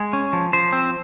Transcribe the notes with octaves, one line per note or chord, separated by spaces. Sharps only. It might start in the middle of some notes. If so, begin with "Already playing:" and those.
Already playing: G#3 G#4
C#4
F3
F3 C5
C4